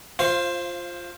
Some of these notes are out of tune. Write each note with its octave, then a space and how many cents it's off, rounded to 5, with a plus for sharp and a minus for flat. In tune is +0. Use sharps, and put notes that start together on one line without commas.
F4 +0 C5 +15 F5 -25